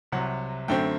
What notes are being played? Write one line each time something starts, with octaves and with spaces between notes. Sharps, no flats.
C2 C3 F#3 F#5
F#2 D3 A3 C4 G5